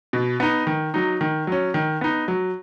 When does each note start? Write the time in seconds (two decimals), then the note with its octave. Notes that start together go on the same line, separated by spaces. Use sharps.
0.13 B2
0.40 B3 D#4
0.67 D#3
0.94 F#3 D#4
1.21 D#3
1.47 F#3 C#4
1.74 D#3
2.01 B3 D#4
2.28 F#3